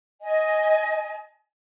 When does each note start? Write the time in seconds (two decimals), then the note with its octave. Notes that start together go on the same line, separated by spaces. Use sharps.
0.21 D#5 G#5